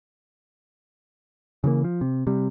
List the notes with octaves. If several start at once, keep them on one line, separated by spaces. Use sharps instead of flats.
C#3 E3 G3 A#3
F3
C3
C3 G3